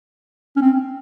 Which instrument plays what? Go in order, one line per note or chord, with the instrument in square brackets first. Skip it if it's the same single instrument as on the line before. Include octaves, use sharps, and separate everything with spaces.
[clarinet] C#4
C4